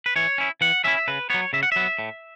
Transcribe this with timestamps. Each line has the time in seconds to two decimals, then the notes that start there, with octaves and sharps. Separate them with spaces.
0.06 B4
0.16 E3 C#5
0.38 C#4 E4
0.61 E3 F#5
0.84 C#4 E4 E5
1.08 C#3 B4
1.30 F#3 B3 C#5
1.53 C#3 E5
1.63 F#5
1.72 F#3 B3 E5
1.99 A2